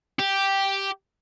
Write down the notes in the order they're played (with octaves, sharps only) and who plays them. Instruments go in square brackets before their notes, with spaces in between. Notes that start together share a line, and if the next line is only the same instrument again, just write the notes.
[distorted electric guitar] G4